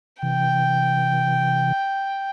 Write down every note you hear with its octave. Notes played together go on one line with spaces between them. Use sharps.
C3 E3 G5